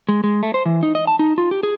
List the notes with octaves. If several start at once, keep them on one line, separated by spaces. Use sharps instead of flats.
G#3
G#3
A3
C5
E3
D#4
D#5
A5
D#4
F4
G4
G#4